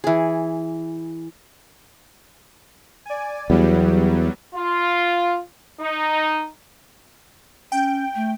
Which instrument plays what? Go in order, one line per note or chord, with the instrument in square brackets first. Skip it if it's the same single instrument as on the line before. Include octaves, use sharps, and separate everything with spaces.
[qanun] E3 G#4
[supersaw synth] D5 G#5
[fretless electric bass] E2 [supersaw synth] F#3 G3 B3
[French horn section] F4
D#4
[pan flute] C#4 [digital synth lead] G5
[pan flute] A3